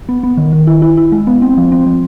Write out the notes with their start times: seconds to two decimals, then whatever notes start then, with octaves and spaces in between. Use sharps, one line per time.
0.09 B3
0.23 B3
0.37 D#3
0.52 D#3
0.67 E4
0.82 E4
0.97 E4
1.12 G#3
1.27 B3
1.42 C4
1.57 F3
1.72 C4
1.86 F3